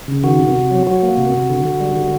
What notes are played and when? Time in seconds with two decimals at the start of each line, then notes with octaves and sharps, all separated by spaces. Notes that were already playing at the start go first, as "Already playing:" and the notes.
0.08 C#3
0.24 D#3 F#4
0.39 C3
0.55 C3
0.71 F#3
0.87 F#3 F#4
1.03 A#3
1.17 C3
1.34 C3
1.49 D3
1.65 D3
1.80 G3
1.97 D3